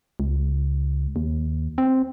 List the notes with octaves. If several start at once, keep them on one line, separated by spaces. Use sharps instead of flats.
C#2
D#2
C4